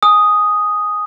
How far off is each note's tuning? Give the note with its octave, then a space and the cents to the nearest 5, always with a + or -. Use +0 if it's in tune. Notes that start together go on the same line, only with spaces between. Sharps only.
G#5 +0 D#6 +0